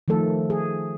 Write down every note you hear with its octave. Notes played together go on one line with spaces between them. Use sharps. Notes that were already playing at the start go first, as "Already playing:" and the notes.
D#3 F3 A3 A4
G#4